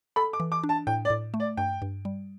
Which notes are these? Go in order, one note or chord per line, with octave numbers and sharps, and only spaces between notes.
A4 B5
D6
E3
D6
D4
A5
A2 G5
D5
A2
A3
D5
G2 G5
G2
G3